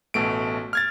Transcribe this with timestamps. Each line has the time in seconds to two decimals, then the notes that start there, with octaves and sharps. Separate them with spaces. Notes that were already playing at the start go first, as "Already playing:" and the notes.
0.14 A1 B2 A3 D7
0.73 F6 G#6 A6